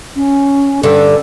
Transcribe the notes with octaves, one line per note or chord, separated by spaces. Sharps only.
C#4
G2 D3 A4